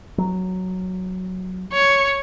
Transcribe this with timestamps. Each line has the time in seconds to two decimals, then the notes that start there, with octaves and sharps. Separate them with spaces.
0.18 F#3
1.73 C#5